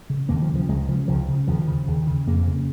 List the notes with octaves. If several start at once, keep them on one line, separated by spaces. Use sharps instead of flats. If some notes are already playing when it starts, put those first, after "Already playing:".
C#3
D#2 A#3
F3
C#3
F3
C#2 G#3
C#3 F3
C#2 F3
C#3
D#2 F3
C#3
D#2
C#3
F2 A#3
C#3